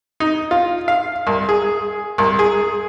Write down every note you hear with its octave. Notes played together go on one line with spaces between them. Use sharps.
D#4
F4
F5
C2
G#4
C2
G#4